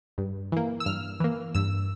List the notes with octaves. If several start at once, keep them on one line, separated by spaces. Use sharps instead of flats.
G2
E3 A#3
E6
G2 F6
E3 A#3
G2 E6